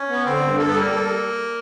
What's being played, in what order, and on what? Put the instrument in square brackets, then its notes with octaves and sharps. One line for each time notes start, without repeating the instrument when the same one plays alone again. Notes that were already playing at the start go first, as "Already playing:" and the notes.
Already playing: [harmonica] C#4
[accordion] B3
[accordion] D3 [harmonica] C4
[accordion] G2
[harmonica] A#3 [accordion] A4
[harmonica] B3
[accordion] G3 [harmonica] A#3
[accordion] A4
G3